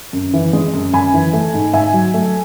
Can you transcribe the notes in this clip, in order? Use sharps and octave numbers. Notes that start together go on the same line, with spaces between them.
F#2
E3
G#3
F#2
F#2 G#5 B5
E3
A3
G#2
G#2 E5 G#5
F#3
A3